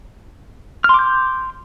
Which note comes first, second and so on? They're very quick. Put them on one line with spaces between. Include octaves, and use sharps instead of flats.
F6 C6 D6 G6